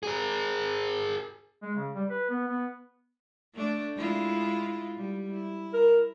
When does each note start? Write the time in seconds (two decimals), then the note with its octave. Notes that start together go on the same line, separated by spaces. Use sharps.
0.03 G#4 A#4
1.62 G#3
1.76 C#3
1.94 G3
2.09 B4
2.30 B3
2.48 B3
3.54 A3 D4
3.96 G#3 E4 F4
4.96 G3
5.31 E4
5.74 A#4